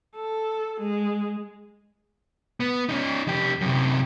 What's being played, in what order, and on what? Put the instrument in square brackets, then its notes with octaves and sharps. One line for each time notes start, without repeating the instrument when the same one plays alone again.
[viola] A4
G#3
[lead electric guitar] B3
C#4 D#4
F2 G4
F#2 C3